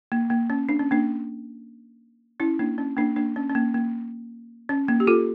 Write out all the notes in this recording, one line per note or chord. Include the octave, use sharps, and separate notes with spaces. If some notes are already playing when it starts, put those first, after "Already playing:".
A#3
A#3
C#4
D4
C#4
A#3 D4
C#4 E4
A#3 D4
C#4
A#3 D4
A#3 D4
C#4
C#4
A#3
A#3
C#4
A#3
G4
F4 A4